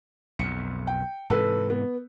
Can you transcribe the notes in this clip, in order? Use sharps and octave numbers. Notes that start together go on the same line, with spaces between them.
B1 F2 C#7
G5
G#2 C3 E3 A4 B4
B3